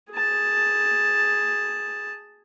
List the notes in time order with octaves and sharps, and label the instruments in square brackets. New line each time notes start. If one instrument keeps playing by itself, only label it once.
[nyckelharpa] G#4 A5